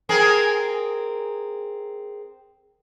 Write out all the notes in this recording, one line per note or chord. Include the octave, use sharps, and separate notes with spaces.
C4 G#4 A#4